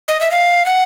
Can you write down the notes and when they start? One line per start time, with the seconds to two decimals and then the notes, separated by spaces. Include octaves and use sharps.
0.08 D#5
0.21 E5
0.31 F5
0.66 F#5